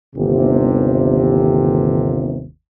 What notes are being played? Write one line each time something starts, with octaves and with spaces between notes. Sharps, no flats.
G1 D#2 C3